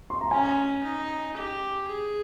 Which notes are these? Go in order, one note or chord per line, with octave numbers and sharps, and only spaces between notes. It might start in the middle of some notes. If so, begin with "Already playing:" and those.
C6
A#5
C#4 G#5
D#4
G4
G#4